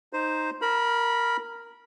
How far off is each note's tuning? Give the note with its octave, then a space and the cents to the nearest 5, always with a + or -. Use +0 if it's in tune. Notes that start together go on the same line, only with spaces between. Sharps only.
D#4 +0 C5 +0
A#4 +0 B5 -20